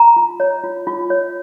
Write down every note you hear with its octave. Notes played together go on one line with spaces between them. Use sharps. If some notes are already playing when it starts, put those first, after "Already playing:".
Already playing: A#5
F4
C#5
F4
F4
C#5